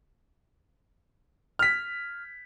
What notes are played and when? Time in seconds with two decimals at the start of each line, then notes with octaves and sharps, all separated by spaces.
1.59 F6 B6